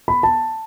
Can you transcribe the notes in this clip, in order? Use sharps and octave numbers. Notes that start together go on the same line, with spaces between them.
B5
A5